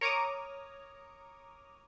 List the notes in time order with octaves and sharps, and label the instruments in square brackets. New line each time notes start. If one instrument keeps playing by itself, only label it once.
[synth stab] A#4 C#5 A#5 D6 D#6